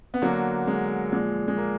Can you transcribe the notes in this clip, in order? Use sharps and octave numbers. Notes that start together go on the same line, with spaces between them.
B3
D3 F#3 A#3
G#3
A#2 F3 G#3
G#3
A#3